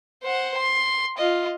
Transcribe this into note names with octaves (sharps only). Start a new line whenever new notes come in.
C5 F#5
C6
F4 D#5